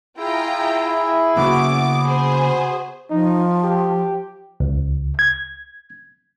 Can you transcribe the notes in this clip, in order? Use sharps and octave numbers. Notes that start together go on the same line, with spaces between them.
E4 F4 G#4 G5 A#5
C#3 A#3 B3 C#4 F#4 D6
G#4 C5
F3 D#4
G4
C#2
G#6